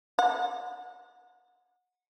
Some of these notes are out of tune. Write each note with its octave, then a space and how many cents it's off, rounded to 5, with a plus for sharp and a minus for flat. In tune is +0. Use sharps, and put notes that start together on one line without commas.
F#5 -25